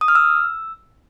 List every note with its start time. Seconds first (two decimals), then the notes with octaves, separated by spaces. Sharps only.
0.01 D#6
0.08 F6
0.15 E6